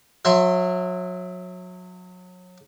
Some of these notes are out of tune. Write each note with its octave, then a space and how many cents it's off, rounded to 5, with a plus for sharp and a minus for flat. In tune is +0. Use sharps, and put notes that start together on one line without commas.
F#3 -30 E5 +0 C6 +0